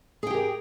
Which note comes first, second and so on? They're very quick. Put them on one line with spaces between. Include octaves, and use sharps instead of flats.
G#4 G5 G4 A#4